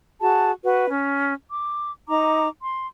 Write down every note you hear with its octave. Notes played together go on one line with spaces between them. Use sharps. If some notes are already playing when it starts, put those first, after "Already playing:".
F#4 G#4 A5
F#4 B4
C#4
D6
D#4 A#5 D6
C6